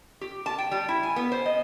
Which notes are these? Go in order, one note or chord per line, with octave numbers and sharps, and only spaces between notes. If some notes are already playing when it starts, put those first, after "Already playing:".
G4
A5
G5
G3
E4
G#5
B3
C5
D#5